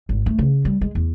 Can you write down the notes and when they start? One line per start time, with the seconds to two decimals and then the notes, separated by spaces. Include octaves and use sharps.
0.09 G#1
0.26 A3
0.39 C#3
0.65 G3
0.81 G#3
0.95 E2